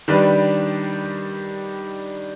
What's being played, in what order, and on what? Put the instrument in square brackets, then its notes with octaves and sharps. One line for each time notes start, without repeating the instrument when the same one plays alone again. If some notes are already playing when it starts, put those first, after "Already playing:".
[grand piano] D#3 G3 D4 G4 B4